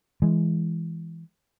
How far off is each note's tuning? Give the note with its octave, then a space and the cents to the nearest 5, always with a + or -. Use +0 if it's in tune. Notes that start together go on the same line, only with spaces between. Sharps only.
E3 +5 G#3 +0